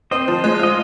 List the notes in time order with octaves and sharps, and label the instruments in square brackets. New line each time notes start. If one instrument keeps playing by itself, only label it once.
[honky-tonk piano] C4 [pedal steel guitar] C5 D#5
[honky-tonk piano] F3
G#3
[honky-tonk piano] F4 [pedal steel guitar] D#5